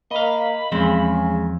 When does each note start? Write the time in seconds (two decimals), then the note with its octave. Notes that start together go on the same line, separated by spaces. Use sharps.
0.11 A#3 D#5 F5 B5
0.72 E2 C#3 F3 G#3 C4